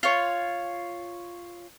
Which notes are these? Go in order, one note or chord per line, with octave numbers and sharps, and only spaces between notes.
F4 C#5